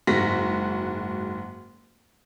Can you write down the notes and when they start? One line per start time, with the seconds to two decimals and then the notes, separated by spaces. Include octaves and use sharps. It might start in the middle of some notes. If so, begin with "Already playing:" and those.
0.07 F#1 G#2 F#4 A#6 B6